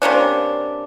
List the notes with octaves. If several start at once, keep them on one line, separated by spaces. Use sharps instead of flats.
C3 A#3 C#4 D4